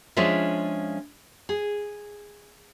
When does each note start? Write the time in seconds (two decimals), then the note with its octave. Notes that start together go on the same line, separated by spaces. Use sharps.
0.17 F3 G#3 C#4 D4 F4 E5
1.49 G#4